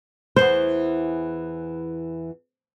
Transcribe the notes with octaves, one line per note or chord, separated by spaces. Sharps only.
E2 E3 B3 C5